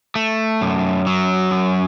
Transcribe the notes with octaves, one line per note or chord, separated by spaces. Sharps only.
A3
F#2
F#3
F#2